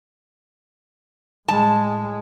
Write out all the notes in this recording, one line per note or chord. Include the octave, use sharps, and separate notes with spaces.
A2 G#3 A5